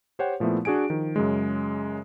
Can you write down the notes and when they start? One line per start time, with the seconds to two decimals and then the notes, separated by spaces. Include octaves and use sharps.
0.19 G4 C5 C#5 F#5 G5
0.40 A#2 F3 A3 B3 E4
0.65 D4 F#4 G#4 G#5 D7
0.90 D#3 F3
1.16 F#2 C#3 G#3